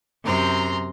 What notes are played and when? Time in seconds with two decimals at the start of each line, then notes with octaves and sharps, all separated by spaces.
0.25 F#2 C3 A#5 C6